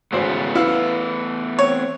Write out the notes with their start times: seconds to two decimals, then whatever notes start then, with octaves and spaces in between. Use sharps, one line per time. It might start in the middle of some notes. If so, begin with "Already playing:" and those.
0.12 G#1 C#3 E3 A3 B3 C5
0.55 E4 B4 F5
1.59 C4 C#5